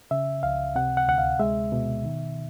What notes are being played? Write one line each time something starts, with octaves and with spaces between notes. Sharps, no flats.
C#3 E5
C#2 F5
C3 F#5
F#5
D2 F#5
F5
G#3 E5
B2
D#3